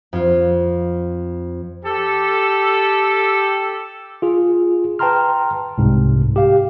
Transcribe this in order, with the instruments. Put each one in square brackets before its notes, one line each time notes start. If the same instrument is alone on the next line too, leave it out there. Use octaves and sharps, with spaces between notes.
[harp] F2 F4
[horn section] G4 A4
[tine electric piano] F4 G#4
B4 G5 A5 A#5 C6 F6
C2 G#2 C3
G4 F5